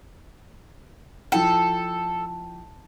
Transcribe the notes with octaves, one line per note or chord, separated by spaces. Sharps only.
F3 E4 A4 G5